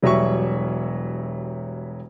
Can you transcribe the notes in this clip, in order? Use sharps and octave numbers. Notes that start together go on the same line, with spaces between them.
E1 F#3 G3 E5 C#6